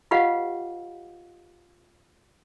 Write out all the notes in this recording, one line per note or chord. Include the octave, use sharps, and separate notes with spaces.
F4 G4 B4 D#5 F5 F#5